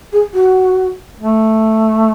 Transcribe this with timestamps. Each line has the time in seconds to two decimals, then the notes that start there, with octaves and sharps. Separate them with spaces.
0.13 G#4
0.34 F#4
1.19 A3